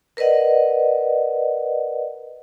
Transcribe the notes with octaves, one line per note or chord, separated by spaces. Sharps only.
A#4 B4 D5 D#5 F#5